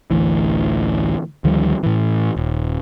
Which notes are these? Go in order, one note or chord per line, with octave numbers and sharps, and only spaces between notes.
A1 D2 E3
D2 D#3 F3 G3
A2 E3
D#1